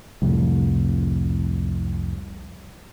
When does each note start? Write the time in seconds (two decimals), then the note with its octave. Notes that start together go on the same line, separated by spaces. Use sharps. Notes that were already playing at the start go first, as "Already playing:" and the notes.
0.22 C2 F2 A2